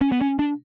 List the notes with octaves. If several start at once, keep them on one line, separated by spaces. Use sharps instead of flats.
C#4
B3
C#4
D4